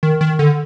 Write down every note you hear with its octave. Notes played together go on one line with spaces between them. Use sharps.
D#3
D#3
D3